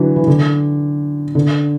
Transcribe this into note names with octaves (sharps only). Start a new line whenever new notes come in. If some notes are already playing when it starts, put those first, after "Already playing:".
Already playing: D3 E3 F#3
E3
D3
D3